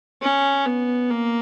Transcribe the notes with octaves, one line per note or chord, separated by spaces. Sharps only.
C#4
B3
A#3